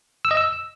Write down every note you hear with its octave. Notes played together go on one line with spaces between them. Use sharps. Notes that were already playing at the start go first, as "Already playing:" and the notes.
E6
D#5
E6